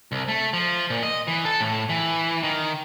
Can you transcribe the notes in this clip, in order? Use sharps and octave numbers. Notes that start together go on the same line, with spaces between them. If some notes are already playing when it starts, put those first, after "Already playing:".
C2
A3
F3
A#2
D#5
E3
A4
A2
E3
D#3